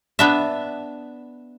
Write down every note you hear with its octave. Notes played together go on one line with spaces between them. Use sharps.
B3 D4 E5